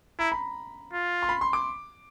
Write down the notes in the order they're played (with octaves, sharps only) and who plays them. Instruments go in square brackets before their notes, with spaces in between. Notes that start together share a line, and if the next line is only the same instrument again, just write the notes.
[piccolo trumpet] E4 [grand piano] A#5
[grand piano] B5
[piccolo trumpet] F4
[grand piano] C6
B5
C6
D6